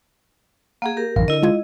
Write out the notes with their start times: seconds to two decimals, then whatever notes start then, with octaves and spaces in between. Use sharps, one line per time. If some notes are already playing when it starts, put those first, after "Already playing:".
0.82 A#3 G#4 F5 F#5 A#5
0.97 G4 A#4
1.16 A1 F#2 D#3 A#4 F5
1.28 D3 E4 D#5
1.43 G#3 F4 G#6